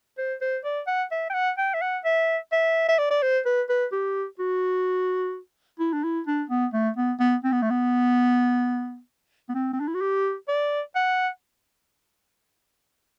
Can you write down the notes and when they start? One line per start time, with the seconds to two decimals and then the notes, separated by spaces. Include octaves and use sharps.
0.18 C5
0.41 C5
0.64 D5
0.87 F#5
1.11 E5
1.30 G5
1.34 F#5
1.58 G5
1.74 E5
1.82 F#5
2.05 E5
2.52 E5
2.88 E5
2.99 D5
3.11 D5
3.23 C5
3.45 B4
3.69 B4
3.92 G4
4.39 F#4
5.79 E4
5.93 D4
6.04 E4
6.27 D4
6.50 B3
6.73 A3
6.97 B3
7.20 B3
7.44 C4
7.52 B3
7.62 A3
7.70 B3
9.49 B3
9.55 C4
9.73 C4
9.80 D4
9.88 E4
9.95 F#4
10.01 G4
10.48 D5
10.95 F#5